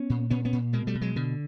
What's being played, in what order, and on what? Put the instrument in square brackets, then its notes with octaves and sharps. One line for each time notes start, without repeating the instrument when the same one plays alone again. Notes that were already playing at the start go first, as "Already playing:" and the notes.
Already playing: [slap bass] B3 C#4
A#2
A#2 B3 C#4
B3 C#4
A#2
B2 G#3 A#3
G3 A3
B2
F#3 G#3
B2 D3